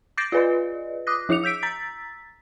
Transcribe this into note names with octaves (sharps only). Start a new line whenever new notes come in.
D6 G6 A6 A#6 C7 D7
F4 G#4 B4 D5 D#5
D6 D#6 F#6 A#6
F3 E4 G#4 D6 C#7 F7
E6 G6 B6 D7
A#5 E6 A6 B6